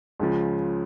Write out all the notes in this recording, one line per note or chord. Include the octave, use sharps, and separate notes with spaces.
C#2 C#3 F3